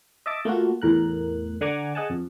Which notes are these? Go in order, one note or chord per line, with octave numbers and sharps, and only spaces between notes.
D#5 E5 A5 D6
A3 A#3 F4 F#4
E2 A2 A#4 F#6
D3 F#5 G#5 A#5 D6 G#6
G#4 D#5 F#5 G#5 A5
F2